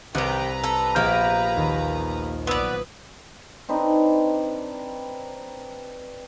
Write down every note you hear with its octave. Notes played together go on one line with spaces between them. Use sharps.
C2 D#3 G4 B4 A#5 F#6 C#7
A4
A#1 A#3 B3 G4
D#2
B1 B3 B4 D5 D#6 E6 G#6
C4 D4 D#4 B4